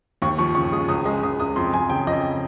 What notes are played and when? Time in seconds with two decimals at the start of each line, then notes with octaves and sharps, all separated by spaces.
0.22 D#2 C#6
0.38 F3 C#6
0.55 C#3 C#6
0.72 G#3 D#6
0.88 C#2 D#6
1.05 G#3 D#6
1.23 C#2 D#6
1.40 C#2 D#6
1.56 F2 C6
1.73 F2 G#5
1.90 C#3 G5
2.07 F2 D#5